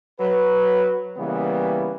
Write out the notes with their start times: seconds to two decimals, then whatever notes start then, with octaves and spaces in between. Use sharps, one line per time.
0.19 F#3 B4
1.17 C#3 E3 G3 A#3 B3